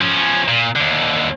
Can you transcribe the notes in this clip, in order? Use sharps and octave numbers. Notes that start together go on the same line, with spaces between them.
F3 C#4
A#2
D#2 D3